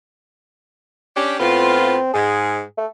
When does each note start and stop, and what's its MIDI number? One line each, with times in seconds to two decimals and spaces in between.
1.15 1.38 61
1.15 1.38 62
1.15 1.38 67
1.40 1.97 45
1.40 1.97 59
1.40 2.10 60
1.40 1.97 65
2.13 2.61 44
2.13 2.63 68
2.77 2.86 57